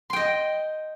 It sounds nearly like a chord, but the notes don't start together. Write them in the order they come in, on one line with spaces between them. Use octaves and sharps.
C6 G5 D#5